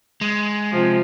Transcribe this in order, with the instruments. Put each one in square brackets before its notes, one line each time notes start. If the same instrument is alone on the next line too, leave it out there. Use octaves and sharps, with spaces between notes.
[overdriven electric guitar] G#3
[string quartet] C3 F3